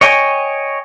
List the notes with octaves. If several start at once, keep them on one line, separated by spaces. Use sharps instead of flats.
C#5 D#5 G5 G#5